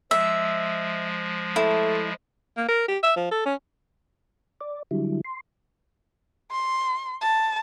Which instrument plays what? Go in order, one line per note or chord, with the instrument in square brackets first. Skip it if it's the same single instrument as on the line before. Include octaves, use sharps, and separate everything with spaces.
[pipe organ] F3 G#3 [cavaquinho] E5
[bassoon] A3 [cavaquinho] E4
[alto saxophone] A#3
A#4
G4
E5
F3
A4
C#4
[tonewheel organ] D5
D3 F#3 G3 E4
C6
[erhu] C6
A5